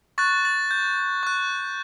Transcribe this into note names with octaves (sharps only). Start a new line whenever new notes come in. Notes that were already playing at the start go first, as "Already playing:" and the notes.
C#6 F#6 A6
A6
G6
C#6 F#6